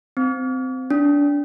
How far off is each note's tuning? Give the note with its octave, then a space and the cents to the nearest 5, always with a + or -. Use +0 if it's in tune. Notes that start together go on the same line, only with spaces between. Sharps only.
C4 -20
D4 -25